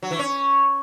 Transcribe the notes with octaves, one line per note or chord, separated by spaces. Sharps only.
F#3
E3
C#4